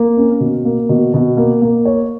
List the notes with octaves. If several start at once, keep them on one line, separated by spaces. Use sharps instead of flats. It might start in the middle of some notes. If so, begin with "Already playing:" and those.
Already playing: A#3
C#4
B2
A#3
B2
B2
A#3
A#3
C#5